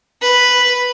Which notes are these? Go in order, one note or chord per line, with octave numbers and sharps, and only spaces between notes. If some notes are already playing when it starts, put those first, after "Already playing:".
B4